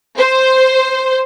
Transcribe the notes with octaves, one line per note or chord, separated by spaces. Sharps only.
C5